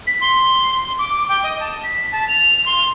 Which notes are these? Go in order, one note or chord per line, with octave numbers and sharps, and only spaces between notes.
B6
C6
D6
G5
D#5
A5
B6
A5
F7
C6